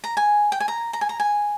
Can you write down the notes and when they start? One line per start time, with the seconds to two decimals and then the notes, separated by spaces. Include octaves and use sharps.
0.04 A#5
0.17 G#5
0.52 G5
0.60 G#5
0.68 A#5
0.93 A#5
1.01 G#5
1.09 A#5
1.20 G#5